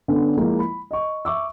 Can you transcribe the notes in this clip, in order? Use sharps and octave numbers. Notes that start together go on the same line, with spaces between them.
D3 B3 C#4 D4
F3 G#3 A#3 E4
B5
D#5 C#6
E5 C#6 D6 E6